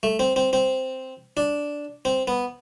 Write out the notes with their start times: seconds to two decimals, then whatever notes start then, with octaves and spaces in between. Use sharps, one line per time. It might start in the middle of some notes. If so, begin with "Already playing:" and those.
0.03 A3
0.19 C4
0.36 C4
0.53 C4
1.37 D4
2.05 C4
2.28 B3